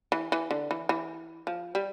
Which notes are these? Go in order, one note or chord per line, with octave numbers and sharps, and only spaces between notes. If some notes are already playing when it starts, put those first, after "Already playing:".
E3
E3
D3
E3
E3
F3
G3